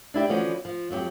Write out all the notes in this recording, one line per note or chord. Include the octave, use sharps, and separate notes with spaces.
D4 E4 G4
D3 E3 F3 B3 C#4 F#4
F3
F2 F#3 F#4 G4